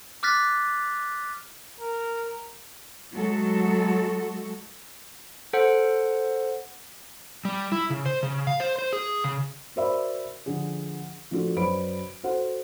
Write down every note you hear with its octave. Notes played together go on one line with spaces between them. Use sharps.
D6 F6 F#6 A6 B6
A#4
F#3 G#3 A3 F#4 A4
A4 C5 F#5
G3
E4
C#3
C5
C#3
F5
C5
C5
G#4
C#3
F#4 A#4 C5 D5 E5 B5
D3 F3 G#4
F3 A3 D4 F4 F#4 A4
F#2 B4 C5 D5 B5 D7
F#4 A4 C5 F#5